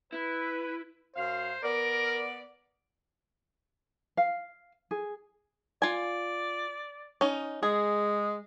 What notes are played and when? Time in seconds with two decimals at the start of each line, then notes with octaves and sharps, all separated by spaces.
0.12 E4 B4
1.16 F#2 C5 F5
1.63 B3 A#4 D5
4.17 F5
4.91 G#4
5.82 F4 D5 G#5
7.21 C#4 D#4
7.63 G#3 G#4